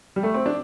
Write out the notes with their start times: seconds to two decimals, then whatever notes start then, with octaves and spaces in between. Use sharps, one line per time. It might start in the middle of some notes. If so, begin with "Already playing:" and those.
0.16 G3
0.23 A3
0.34 C4
0.46 D4